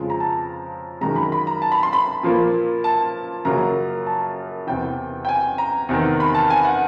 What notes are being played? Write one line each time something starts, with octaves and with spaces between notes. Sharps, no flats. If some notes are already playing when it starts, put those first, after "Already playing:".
Already playing: F2 C#3 F3 G#3
A#5
A5
F#2 D#3 G#3 A#5
B5
B5
A#5
A5
B5
C6
B5
A#2 F3 A#3
A5
F#2 C#3 F#3 A#3 A#5
A5
E2 C3 E3 G5
G5
G#5
A#5
E2 C3 D#3
B5
A5
G#5
F#5